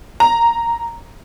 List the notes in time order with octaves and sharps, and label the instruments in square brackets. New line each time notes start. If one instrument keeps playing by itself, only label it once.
[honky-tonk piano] A#5